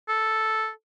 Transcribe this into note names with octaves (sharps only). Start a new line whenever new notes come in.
A4